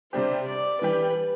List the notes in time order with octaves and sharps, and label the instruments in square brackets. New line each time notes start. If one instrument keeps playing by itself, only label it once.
[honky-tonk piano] C3 G3 D4 G4 [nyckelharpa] C5
[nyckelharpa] D5
[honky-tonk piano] E3 G3 D4 G4 [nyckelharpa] B4